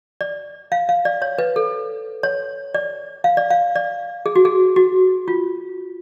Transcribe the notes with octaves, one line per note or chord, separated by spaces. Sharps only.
D5
F5
F5
D5
C#5
B4
A4
C#5
D5
F5
D5
F5
D5
G#4
F#4
G#4
F#4
F4